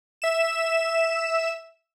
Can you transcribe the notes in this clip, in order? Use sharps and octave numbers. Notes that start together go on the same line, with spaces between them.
E5 E7